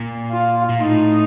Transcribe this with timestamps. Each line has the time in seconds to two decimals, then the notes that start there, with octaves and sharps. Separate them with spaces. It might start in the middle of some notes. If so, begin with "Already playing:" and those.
Already playing: A#2
0.31 F4
0.69 A#2
0.80 A2 D#4